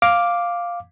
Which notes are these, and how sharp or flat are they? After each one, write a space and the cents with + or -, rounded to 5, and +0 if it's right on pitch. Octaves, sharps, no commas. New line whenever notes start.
F5 +0 D6 +0